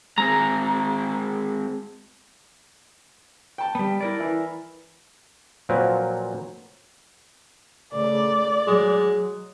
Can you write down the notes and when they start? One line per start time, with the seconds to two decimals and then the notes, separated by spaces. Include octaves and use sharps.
0.18 G#3 C4 G#4 A#5
3.58 G5 A5
3.75 G3 B3
4.00 E4 A#4 D5
4.20 E3
5.69 A#2 F3 F#3 C4 A#4 B4
7.94 C#3 A3 D5
8.67 F#3 G#3